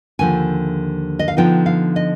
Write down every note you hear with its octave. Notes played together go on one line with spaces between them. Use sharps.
D#2 D3 F3 G#5
D#5
F5
D3 F3 B3 D#4 G5
F5
D#5